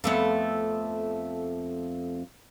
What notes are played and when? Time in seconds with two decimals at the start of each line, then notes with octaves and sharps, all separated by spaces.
0.04 F2 A3 B3